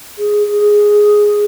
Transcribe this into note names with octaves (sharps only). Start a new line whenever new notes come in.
G#4
G#4